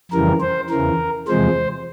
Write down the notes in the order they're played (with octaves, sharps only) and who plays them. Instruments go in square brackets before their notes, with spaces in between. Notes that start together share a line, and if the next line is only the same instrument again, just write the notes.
[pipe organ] F2 C#3 E3 G3 A#4
C5
E2 C#3 E3 A#4
E2 C3 F3 G#3 C5